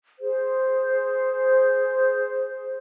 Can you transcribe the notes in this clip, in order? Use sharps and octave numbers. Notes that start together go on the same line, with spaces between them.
G#4 C5